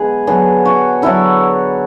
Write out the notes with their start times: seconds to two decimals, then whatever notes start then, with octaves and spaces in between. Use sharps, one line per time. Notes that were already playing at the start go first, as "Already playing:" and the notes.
Already playing: D3 G#3 B3 G#4 B4
0.27 D3 F#3 B3 G#4
0.65 F#4
1.02 D3 F#3 B3 E4